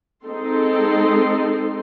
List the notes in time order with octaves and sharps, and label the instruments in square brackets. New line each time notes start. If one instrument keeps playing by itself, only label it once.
[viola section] G#3 C4 D#4 A4 C6